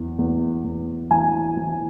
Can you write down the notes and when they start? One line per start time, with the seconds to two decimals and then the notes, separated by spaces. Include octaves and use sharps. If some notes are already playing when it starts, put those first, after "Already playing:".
Already playing: E2
0.19 E2
0.64 E2
1.11 E3 G#5
1.57 E3